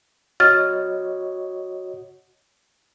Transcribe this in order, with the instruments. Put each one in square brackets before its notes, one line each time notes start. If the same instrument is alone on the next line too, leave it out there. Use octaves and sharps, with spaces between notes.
[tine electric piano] F#4 C#5 D#5 [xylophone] F6 A6